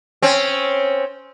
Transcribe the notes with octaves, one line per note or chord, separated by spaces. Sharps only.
C4 C#4